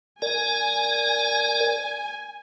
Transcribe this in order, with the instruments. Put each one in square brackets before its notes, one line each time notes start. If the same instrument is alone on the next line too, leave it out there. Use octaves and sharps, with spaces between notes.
[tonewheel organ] A#4 D5 [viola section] G#5